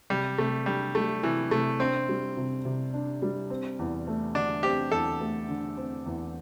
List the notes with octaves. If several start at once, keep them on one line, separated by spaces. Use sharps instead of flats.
C3 G3
C3 A3
G3 D4
G3 A3
C3 E3
C3 A3
C4 D4
G3
C3
C3
D4
G3
C4
E2
A3
D3 D4
C4 G4
E2 A4
A3
D3
C4
E2